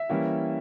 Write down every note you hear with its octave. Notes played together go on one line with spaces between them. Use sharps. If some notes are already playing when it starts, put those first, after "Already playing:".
Already playing: E5
E3 G3 A#3 C#4 E4